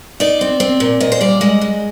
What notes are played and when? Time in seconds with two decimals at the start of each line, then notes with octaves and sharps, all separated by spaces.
0.20 D#4 D5
0.41 C4
0.60 C4
0.80 A#2
1.00 A#2 D#5
1.12 C5
1.21 G3 D5
1.41 G#3 D#5
1.61 G#3